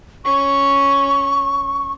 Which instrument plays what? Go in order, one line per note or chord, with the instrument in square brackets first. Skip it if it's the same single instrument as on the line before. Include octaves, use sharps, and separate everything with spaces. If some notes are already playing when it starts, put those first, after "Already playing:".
[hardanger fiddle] C#4 [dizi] C#6